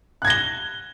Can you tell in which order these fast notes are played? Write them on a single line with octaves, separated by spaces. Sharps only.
F#6 G#6 A#6 G7